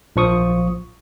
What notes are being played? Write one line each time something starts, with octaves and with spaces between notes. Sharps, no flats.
A#1 F3 C#6 D#6